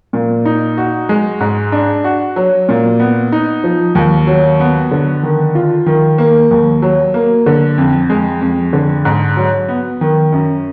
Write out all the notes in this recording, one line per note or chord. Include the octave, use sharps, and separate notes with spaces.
A#2
D#4
F#4
G#3
G#2
D4
F#4
F#3
A#2
B3
D#4
F3
D#2
F#3
B3
D3
D#3
F4
D#3
A#3
D#2
F#3
A#3
D3
F2
G#3
F2
D3
G#2
F#3
B3
D#3
F#2